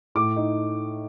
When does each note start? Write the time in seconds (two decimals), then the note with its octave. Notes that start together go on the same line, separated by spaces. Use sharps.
0.15 A2 D6
0.36 D#4